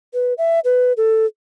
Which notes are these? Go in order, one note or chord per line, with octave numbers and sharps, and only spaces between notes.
B4
E5
B4
A4